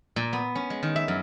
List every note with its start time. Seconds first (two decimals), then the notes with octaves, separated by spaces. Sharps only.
0.16 A#2
0.33 B3
0.55 C#4
0.70 G#3
0.83 D#3
0.96 E5
1.08 F#2